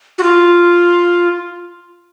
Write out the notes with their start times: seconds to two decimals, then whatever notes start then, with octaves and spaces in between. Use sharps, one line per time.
0.18 F#4
0.23 F4